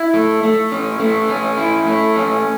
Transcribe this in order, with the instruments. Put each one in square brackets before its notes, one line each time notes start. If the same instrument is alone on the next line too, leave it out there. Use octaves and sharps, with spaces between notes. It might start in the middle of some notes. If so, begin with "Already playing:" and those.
Already playing: [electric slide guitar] E4
A3
A3
C#4
A3
C#4
E4
A3
C#4